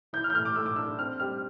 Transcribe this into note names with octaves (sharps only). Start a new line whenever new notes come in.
E3 G6
F6
G6
A2 F6
D6
A2 E6
D6
D4 E6
C4 F6
G3 F6